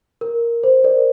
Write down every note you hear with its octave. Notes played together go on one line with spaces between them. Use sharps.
A#4
C5
A#4 D5